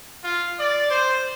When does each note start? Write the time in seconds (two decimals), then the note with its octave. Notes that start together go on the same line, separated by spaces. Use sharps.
0.24 F4
0.59 D5
0.90 C5